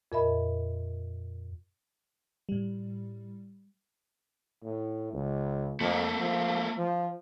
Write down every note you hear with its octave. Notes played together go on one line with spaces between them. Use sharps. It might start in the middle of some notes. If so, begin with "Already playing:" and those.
F2 A#2 A#4 D#5 E5 B5
A2 G3
A2
C#2
F2 A3 A#3
F3
F3